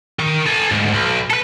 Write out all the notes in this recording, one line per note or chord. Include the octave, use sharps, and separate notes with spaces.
D#3
A4 G#5
D2 G#2
B1
A4 B4